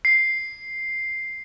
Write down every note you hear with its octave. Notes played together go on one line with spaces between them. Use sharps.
C7